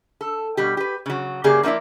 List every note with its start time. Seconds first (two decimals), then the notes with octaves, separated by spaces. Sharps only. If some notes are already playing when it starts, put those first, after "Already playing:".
0.21 A4
0.57 B2 G3 G4
0.77 G4 B4
1.06 C#3 F#3
1.44 F#2 C#3 A#3 G4 G#4 D5
1.63 F3 A#3 D#4 E4 D5